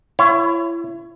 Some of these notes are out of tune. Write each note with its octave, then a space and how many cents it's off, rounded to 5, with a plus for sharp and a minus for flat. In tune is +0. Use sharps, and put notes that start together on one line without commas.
E4 +30 C#5 +0